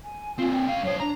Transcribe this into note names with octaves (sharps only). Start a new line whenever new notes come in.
G#5
C4 D4 F4
G5
G#3 F5
F#2 C5 C#5
D4 A#5